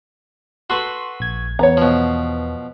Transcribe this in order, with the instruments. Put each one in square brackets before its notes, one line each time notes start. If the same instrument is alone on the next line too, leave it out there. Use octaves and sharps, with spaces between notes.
[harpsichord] F#4 A4 B4 [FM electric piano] C6
[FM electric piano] A#1 G#6
[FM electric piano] E2 B3 [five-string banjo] C#5 A#5
[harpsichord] B2 F3